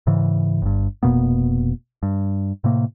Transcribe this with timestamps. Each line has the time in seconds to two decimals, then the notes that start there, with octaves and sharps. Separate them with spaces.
0.07 G#2 C#3 E3
0.62 G1 G2
1.03 F1 B2 A#3 B3
2.03 G2
2.64 A2 C3 A#3